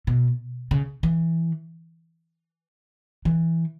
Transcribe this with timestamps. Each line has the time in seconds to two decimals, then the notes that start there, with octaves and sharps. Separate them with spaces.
0.07 B2
0.71 C#3
1.03 E3
3.25 E3